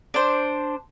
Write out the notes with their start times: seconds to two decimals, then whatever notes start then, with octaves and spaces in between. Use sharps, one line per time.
0.14 D4 C5